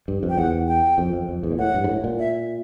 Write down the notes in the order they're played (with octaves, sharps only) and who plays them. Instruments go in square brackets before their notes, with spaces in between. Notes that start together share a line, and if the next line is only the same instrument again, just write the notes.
[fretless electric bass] G2
F2
[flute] G5
[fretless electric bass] E2 [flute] F#5
[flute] G5
[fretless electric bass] F2
F2
F2
E2
A#2
[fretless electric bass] A2 [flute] F#5
[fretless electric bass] G2
G#2
A2
A#2
[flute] E5